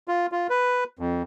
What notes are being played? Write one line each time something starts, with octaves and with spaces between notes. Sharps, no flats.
F4
F4
B4
F2